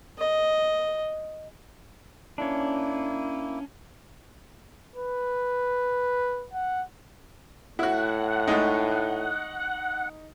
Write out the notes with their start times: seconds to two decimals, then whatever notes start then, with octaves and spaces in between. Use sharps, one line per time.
0.18 D#5
2.38 A#3 C#4 D4 E4
4.96 B4
6.53 F#5
7.79 A2 E4 F#4 F#5
8.48 G#3 A3 D#4